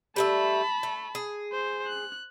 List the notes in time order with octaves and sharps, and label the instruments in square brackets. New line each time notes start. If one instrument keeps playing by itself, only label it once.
[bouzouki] G3 A3 E5 [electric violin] A5 B5
[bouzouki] A3
G#4
[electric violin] C5
F#6